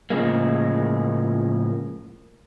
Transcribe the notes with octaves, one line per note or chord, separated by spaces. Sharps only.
A2 C#3 F3 G#3 A#3